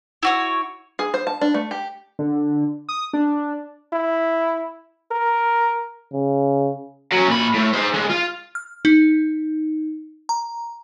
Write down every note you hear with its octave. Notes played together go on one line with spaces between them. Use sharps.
E4 F#4 C#5
G#4
C5
A5
D4
A3
G4
D3
D#6
D4
E4
A#4
C#3
F#3 C#4
A#2 B5
A2 A3
G#4 C5
A2 G#3
F4
F6
D#4
A#5